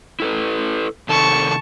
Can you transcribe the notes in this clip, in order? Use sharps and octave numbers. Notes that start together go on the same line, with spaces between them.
E4 A4 B4
C3 D#3 A4 A5 C#6